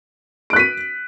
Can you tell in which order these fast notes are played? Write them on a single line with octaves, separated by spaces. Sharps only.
D7 F#6 B6 D#7